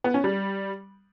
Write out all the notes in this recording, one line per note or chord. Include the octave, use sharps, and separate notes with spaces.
B3
C#4
G3